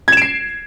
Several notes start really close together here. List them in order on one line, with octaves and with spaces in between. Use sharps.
G#6 E7 D7 C7